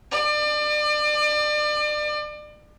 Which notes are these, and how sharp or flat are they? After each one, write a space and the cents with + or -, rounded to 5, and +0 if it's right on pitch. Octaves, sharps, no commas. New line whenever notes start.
D5 +35